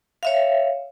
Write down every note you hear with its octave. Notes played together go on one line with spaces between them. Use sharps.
C#5 E5 F5